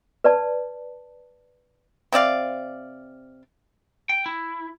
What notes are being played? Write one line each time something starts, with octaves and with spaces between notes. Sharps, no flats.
B4 D5 A5
C3 C4 D5 F5
G5
E4